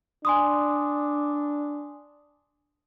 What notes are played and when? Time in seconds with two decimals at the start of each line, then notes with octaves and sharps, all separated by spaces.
0.25 D4 G#5 C6 D#6